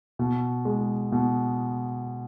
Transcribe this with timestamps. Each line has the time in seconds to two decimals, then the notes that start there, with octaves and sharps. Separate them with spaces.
0.19 B2
0.65 G#3
1.12 B2